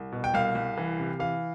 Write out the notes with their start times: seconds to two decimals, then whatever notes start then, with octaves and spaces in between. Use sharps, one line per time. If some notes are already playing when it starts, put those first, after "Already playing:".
Already playing: C2
0.12 B2
0.24 G5
0.34 C2 F5
0.55 C2
0.77 E3
0.99 C3
1.19 E3 F5